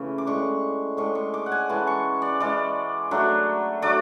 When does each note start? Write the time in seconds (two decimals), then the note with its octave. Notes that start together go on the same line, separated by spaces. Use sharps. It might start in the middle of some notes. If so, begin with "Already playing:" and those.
Already playing: C#3 E3 A3
0.18 D6
0.27 A2 G#3 D4 C#6
0.97 A2 G#3 D4 C#6
1.15 C#6
1.34 D6
1.46 F#5
1.52 G#5
1.69 E3 G#3 C#4 A5
1.87 C#6
2.22 D5
2.40 E3 G#3 C#4 D5
3.11 F#3 A3 D4
3.82 F#3 A3 D4 D5